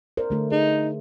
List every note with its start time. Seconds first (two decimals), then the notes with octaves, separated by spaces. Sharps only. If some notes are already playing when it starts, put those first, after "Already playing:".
0.17 A#4 C5 D5
0.30 D3 A3 A4
0.51 D#4 G#4